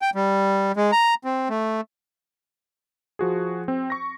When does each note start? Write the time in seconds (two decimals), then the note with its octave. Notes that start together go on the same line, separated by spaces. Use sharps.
0.02 G5
0.15 G3
0.76 G#3
0.92 A#5
1.24 C4
1.49 A3
3.19 F3 F#4 G#4
3.68 C4
3.90 C#6 A#6